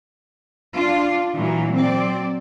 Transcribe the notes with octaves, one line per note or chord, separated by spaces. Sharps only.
D4 F4
A#2 E3 F#3 A#3
F#3 C4 D5